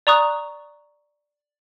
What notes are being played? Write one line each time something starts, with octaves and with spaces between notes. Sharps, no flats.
D5 A#5 C#6 D#6 F#6